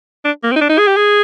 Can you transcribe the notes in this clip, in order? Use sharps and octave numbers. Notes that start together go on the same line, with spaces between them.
D4
A#3
C4
D#4
D4
D#4
G#4
G4
G#4